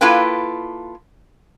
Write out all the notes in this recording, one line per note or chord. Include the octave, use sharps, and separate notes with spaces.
A#3 E4 F4 A4 B4 G5